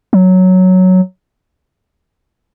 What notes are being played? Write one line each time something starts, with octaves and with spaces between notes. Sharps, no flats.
F#3